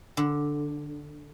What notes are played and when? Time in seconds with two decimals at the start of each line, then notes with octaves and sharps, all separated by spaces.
0.17 D3